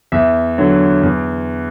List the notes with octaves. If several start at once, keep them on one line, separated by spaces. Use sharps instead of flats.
E2 E5
D3 F#3
E2